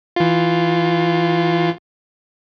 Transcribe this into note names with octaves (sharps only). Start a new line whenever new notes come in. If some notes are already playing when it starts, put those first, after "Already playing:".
E3 F4